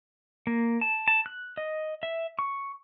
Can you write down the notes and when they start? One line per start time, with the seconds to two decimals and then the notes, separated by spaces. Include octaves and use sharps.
0.47 A#3
0.81 A5
1.08 A5
1.26 F#6
1.57 D#5
2.03 E5
2.39 C#6